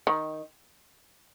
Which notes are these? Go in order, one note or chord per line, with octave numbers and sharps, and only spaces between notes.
D#3